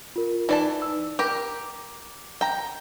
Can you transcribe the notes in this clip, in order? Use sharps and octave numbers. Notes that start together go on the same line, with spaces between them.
F4 A#4
E3 D#4 D5 A5
E6
G4 A#4 D6
G5 A#5